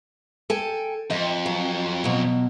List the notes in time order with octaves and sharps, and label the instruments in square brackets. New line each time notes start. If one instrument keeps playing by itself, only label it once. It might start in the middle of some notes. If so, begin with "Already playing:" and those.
[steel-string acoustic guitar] A4 G5 G#5
[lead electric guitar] F2 [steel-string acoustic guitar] D#5 G5
[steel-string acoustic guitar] F#3
B2 F#3